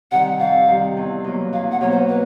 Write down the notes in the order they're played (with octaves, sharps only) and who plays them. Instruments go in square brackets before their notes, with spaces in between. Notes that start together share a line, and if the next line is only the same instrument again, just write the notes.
[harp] C3 D#3 G3 [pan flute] F#5
[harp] F2 [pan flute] F5
[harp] C3 D#3 G3
E2
B2 F#3 A#3
[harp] E2 [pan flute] F5
[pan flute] F#5
[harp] B2 F#3 A#3 [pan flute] C#5
[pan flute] C5
B4